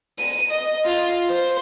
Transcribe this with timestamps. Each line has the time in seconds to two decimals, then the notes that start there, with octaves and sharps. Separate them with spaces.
0.18 D#7
0.51 D#5
0.85 F4
1.30 C5